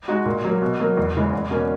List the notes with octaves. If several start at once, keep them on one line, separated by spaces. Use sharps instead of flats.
G#3 D#4 F#4
A#2
F#3 A#3
B2
F#3 A#3
E2
C#3 E3 G#3
E2
B2 A#3 C#4